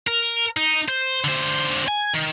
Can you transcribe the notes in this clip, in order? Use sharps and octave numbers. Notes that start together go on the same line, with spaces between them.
A#4
D#4
C5
D3 C5
G#5
D#3